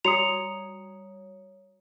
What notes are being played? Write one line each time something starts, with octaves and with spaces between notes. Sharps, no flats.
G3 F#4 C#5 A#5 D#6 C#7 F7